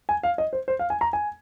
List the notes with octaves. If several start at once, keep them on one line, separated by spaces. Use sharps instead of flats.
G#5
F5
D#5
C5
C5
F5
G#5
A#5
G#5